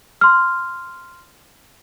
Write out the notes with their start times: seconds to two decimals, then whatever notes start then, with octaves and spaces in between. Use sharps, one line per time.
0.21 C6 F6